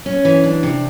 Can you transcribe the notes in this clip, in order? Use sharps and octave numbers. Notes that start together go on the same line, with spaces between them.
C#4
E3
D4
C3